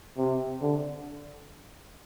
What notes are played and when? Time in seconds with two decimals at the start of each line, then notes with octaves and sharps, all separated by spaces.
0.18 C3
0.62 D3